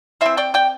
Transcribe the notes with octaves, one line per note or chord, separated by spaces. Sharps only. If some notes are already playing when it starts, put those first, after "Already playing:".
E3 C4 C5 E5
D5 G5
D5 G5